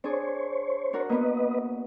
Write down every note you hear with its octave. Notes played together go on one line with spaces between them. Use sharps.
D4 G#4 C5 C#5
D4 F#4 A#4
A#3 B3 B4 D#5